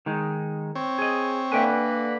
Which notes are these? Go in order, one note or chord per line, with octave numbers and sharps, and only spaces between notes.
D#3 G#3 D#4
C4 C#5
G#4 D#5
D3 A#3 B4 E5 G5 G#5